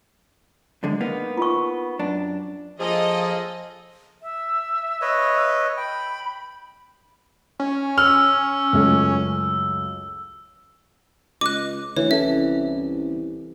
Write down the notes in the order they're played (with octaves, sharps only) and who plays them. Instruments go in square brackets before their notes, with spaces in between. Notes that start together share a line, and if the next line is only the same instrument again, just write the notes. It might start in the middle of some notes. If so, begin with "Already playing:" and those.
[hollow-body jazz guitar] F#2 D3 G#3
A#3 B3 D#4
[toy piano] F4 C#6
[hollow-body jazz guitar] F#2 D4
[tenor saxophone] F3 [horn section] A#3 G#4 A4 [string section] D#5
[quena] E5
[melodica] B4 C#5 D#5
[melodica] G5 [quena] B5
[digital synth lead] C#4
[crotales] E6 [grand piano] F6
[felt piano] C#2 F#2 A3
[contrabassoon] C#2 [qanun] D#5 [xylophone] D6 F#6
[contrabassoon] D2 [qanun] E3 [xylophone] C#5
[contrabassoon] C2 [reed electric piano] C#4 A4 [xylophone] E5